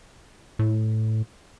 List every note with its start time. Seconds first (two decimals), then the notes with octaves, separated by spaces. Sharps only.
0.59 A2